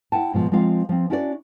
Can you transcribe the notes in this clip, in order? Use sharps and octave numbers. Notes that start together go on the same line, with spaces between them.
E4 F#5 G5 A5
G#2 B2 F3
F3 G#3 C4 F4 F5
F3 C4
C#4 D4 E4 F#4 C5 D5